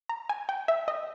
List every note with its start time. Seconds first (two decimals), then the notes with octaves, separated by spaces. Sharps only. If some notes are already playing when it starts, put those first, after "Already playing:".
0.09 A#5
0.29 G#5
0.49 G5
0.68 E5
0.88 D#5